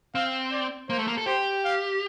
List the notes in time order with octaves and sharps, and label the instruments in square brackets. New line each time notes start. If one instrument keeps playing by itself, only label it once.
[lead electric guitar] C4 [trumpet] F5
[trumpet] D5
[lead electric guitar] A#3 [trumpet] C5
[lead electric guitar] A3
A#3
A4
[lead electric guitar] G4 [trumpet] C5
[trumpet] F5